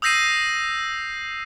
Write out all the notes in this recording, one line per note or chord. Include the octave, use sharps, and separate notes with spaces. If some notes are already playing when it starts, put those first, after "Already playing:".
D#6 E6 G6 A#6 C7 D#7